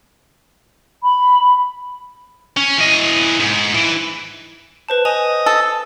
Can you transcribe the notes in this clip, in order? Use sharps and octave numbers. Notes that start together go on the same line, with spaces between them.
B5
C#4
E3 D#5
G#2
E3
B4 C5 A5
D#5 G#5 F7
A4